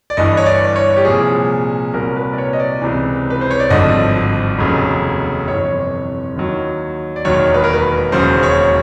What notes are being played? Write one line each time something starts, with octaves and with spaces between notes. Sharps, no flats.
D5
G1 G2 E3 D#5
C#5
D5
C#5
G4
C2 A#2 F3 G#4
C2 A#2 F#3 A#4
B4
D5
C#5
D#5
D5
C#2 C3 E3
B4
C5
C#5
D5
G#1 G2 D3 F3 D#5
F1 D#2 C#3 F#3
G1 F2 C3 E3 C#5
D#2 D#3 F#3
D5
E1 D#2 D#3 F#3 C#5
B4
A#4
B4
E1 D#2 C#3 F#3 C5
C#5